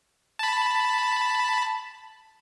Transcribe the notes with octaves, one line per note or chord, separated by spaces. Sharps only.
A5 B5